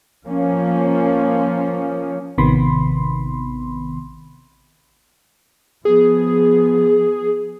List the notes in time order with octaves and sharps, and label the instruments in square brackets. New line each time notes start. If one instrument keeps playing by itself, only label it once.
[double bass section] F3 A#3 C#4
[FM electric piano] A1 C3 D#3 B3 B5 C6
[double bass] F3 B3 [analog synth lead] G#4